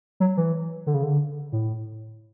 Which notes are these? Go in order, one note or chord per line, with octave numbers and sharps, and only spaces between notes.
F#3
E3
D3
C#3
D3
A2